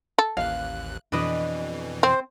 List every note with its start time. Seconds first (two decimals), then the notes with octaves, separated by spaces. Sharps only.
0.18 A4
0.37 A1 D#2 F5 F#6
1.12 F2 B2 E3 D4 B4 D#5
2.03 C4 C5